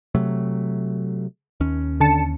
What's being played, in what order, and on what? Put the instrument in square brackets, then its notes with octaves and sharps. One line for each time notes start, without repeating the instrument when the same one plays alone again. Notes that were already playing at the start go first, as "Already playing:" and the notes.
[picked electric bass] C3 F#3 A3
D#2 C#4
[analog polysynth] D3 A5 C#7